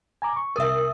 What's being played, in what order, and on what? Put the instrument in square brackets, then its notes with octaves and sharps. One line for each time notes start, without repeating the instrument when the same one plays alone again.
[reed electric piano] G#5 A#5 D6
C#6
[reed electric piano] C2 D#6 E6 [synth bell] A#4 E5